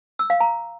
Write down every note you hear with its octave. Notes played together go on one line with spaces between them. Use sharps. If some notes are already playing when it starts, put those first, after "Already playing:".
E6
F5
A#5